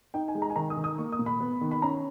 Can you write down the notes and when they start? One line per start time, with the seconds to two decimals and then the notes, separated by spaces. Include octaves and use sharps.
0.14 D#4 G5
0.28 G#5
0.35 G#3
0.42 A#5
0.50 G#5
0.56 D#3 A#5
0.70 D#6
0.77 D#3
0.84 D#6
0.98 A#3 C#6
1.12 D#6
1.19 A#2
1.26 B5
1.40 B3
1.61 D#3
1.71 B5
1.82 C#4 A#5